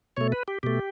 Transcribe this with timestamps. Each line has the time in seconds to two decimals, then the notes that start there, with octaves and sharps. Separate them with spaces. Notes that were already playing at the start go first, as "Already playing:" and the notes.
0.17 B2 A3 C#5
0.32 B4
0.48 G4
0.63 B2 A3 G4